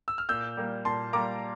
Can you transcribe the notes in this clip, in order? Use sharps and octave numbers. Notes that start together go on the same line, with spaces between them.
E6
F6
A#2 E6 G6
G3 A#3
A#2 A5 C6
G3 A#3 A#5 D6